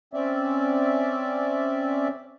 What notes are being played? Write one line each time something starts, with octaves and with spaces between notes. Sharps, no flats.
C4 C#4 D5 E5